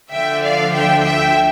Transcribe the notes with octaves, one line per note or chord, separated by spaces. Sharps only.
D2 D3 F3 E5 G5
D5 F5
E5 G5
E5 G5